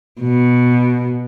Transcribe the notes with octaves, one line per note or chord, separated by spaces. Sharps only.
B2